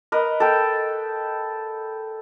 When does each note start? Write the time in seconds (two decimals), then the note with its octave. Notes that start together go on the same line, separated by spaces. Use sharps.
0.12 A#4 B4 D#5
0.40 A4 G5